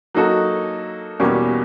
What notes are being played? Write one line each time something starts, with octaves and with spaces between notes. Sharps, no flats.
F#3 A#3 D#4 F#4 A4
E2 B2 G3 A#3 C#4